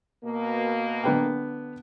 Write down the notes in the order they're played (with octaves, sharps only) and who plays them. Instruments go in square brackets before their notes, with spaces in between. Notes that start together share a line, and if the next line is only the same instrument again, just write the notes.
[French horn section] B2 A#3
[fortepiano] D3 B3 G5